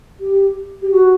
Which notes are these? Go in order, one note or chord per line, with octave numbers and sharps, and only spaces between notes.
G4
G4
F#4